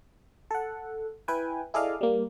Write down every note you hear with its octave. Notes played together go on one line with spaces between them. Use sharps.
A4 F#5
E4 B4 G5 G#5
E4 G#4 A4 D5 D#5 F5
G3 A#3